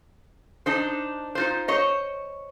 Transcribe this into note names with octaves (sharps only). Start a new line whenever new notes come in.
D4 D#4 C5
D#4 F4 C5
C5 C#5 D#5